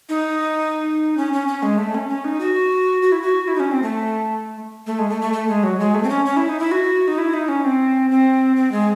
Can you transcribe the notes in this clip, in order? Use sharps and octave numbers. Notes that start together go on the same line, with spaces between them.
D#4
C#4
C#4
C#4
G#3
A3
C#4
C#4
D#4
F#4
F#4
E4
F#4
E4
D#4
C#4
C4
A3
A3
G#3
A3
A3
A3
G#3
F#3
G#3
A3
C4
C#4
C#4
E4
D#4
E4
F#4
D#4
E4
D#4
C#4
C4
C4
C4
G#3